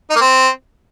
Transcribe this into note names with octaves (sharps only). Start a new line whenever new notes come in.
D#4
A#3
C4